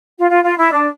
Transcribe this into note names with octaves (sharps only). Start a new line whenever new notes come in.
F4
F4
F4
E4
D4